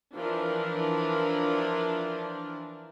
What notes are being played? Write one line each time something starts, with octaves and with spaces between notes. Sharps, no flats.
E3 F3 D4 A#4